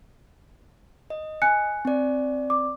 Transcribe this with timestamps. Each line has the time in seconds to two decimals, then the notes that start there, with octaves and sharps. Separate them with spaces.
1.10 D#5
1.42 G#5 F#6 C#7
1.85 C4 D5
2.50 D6